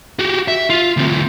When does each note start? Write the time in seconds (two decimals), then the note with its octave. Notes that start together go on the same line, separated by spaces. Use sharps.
0.19 F#4 G4
0.48 E5
0.70 F4
0.97 D2 C4